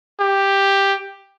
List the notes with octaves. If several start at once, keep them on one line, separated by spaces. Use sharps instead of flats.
G4